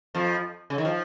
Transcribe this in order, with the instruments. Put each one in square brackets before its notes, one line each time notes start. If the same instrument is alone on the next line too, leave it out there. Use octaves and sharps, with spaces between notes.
[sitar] F2 F3
C#3
D#3
F3